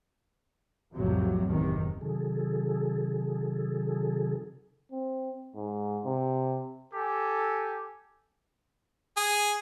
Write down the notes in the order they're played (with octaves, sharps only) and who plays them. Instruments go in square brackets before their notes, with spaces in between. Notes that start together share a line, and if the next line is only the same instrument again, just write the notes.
[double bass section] B1 F2 A2 C3 F#3
F#1 E2 C3 D#3
[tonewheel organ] C3 D#3 F#3 G#4 A4
[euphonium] C4
G#2
C3
[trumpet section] G4 A4 G#5
[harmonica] G#4